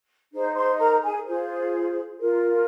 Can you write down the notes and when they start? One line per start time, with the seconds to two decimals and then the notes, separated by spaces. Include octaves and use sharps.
0.32 D#4 G#4 C5
0.56 C5 C6
0.79 A#4 A#5
1.03 G#4 G#5
1.25 F4 G#4 C5
2.20 F4 A#4